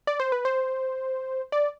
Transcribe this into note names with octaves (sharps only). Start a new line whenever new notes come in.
D5
C5
B4
C5
D5